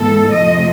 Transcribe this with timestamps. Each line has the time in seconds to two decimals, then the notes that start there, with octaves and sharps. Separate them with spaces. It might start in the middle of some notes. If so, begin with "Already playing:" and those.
Already playing: G#2 E3 G#3 B3 A4
0.34 F2 C3 F3 A3 D#5